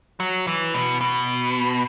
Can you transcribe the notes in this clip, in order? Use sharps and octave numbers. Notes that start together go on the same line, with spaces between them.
F#3
E3
B2
B2